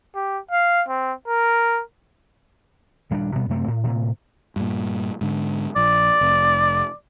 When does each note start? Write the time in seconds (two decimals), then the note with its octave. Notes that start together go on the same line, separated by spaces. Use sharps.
0.15 G4
0.51 F5
0.88 C4
1.28 A#4
3.11 D#1 G3 G#3 D4
3.35 B2 G3 B3
3.49 F#2 C3 A3 C4
3.68 A2
3.83 A2 C3
4.56 G2 A#2
5.21 G#2 D3
5.76 A#1 D5
6.21 F1